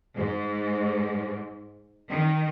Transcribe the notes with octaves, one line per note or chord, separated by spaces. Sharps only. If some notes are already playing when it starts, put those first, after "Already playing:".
G#2
D#3